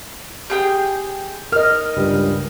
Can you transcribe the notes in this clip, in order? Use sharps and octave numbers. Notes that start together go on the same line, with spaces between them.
G4 G#4 G5
A#4 D#5 F6
C#2 G2 G3